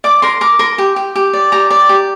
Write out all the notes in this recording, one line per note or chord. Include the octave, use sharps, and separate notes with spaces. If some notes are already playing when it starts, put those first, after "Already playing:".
D5 D6
A#4 C6
A#4 D6
A#4 C6
G4
G4
G4
D5
G4 A#5
D5
G4